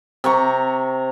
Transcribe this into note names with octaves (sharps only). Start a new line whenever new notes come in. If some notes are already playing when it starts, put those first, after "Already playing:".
C3 A#5 C#6